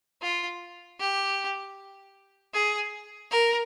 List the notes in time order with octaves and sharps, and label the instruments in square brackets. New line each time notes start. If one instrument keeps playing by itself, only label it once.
[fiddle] F4
G4
G#4
A#4